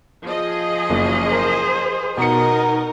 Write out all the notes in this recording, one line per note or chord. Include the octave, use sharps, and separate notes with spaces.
F3 G#4 D#5
F#1
A#4 C5
B2 D#4 A#4 D#5 C#7